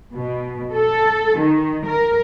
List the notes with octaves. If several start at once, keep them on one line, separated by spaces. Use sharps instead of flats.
B2
A4
D#3
A#4